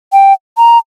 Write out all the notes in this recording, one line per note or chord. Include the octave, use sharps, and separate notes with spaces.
G5
A#5